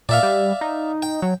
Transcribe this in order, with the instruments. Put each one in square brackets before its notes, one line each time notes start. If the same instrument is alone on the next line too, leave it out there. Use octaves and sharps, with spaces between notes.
[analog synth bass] A#2 [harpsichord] D5 E5 F5
[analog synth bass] G3
D#4
[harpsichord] G5
[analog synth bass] F#3